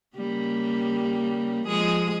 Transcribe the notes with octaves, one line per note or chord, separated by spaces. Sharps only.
C#3 G3 A#3
F3 G#3 G#4